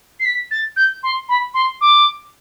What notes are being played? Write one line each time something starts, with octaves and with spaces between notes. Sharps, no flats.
C7
B6
A6
G6
C6
B5
C6
D6